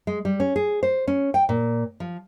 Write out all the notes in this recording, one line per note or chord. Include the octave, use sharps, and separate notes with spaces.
G#3
G3
C#4
G#4
C5
C#4
G5
A#2
F3